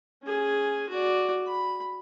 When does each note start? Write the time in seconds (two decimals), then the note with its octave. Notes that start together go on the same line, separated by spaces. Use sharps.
0.23 C#4 G#4
0.89 F#4 D5
1.46 B5